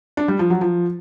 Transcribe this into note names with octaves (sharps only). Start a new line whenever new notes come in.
D4
G3
F3
F#3
F3